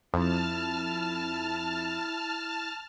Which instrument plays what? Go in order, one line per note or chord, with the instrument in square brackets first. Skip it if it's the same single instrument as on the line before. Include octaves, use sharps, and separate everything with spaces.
[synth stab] F2 [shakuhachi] E4 [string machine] A5 F6